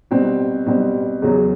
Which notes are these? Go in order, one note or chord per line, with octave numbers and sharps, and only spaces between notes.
B2 G3 C4
B2 G3 C4
E2 C#3 F#3